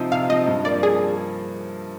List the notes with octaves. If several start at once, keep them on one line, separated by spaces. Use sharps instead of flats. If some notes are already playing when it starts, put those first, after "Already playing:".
Already playing: C3 F3 C4 D#4
C3 F5
F3 C4 D#4 D#5
G2
F3 A#3 D5
G#4